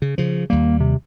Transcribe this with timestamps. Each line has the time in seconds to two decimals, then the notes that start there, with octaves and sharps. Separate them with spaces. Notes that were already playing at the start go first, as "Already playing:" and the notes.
0.02 C#3
0.18 C#3 F3
0.50 D#2 G3 A#3
0.80 C3